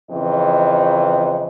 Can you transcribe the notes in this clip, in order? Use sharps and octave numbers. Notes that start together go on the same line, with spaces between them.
F2 C#3 E3 D#5